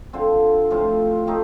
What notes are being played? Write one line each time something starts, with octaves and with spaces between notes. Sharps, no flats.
D3 F3 C4
A2 F3 C4 F4
A3 C4 D#4 G4